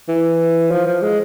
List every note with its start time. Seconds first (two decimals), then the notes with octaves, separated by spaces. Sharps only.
0.09 E3
0.71 F3
0.87 F3
1.02 G#3